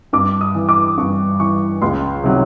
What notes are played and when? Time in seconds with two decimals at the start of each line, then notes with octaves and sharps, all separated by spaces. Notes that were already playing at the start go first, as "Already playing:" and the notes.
0.13 G2 D6
0.41 D#6
0.55 E3
0.69 D6
0.97 G2 C#6
1.40 E3 C#6
1.82 C#2 C6
2.24 C3 D#3 F#3